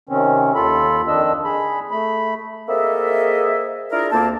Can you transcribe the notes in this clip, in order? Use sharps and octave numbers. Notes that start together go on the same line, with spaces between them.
C3 D#3 C4 C#4
D#2 F4 A4 B5
F2 D#3 D4 D#5 E6
G#4 B5
A3 B5
A#3 C4 G#4 A4 D#5 E5
D4 E4 F4 G#4 A#4
D2 A#3 C4 A5